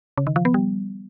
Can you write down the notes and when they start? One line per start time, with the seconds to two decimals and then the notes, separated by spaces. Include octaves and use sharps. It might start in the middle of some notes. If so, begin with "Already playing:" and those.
0.18 C#3
0.27 D#3
0.36 F3
0.45 B3
0.54 G3